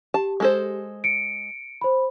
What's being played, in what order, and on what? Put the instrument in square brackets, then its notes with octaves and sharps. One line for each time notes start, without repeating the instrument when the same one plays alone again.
[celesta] G4 [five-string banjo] A5
[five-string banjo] G#3 A4 C5
[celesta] C#7 D7
C5 B5